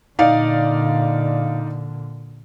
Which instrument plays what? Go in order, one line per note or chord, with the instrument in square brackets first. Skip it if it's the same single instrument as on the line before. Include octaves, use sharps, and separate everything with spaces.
[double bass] A#2 D3 [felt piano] D#4 D5 F5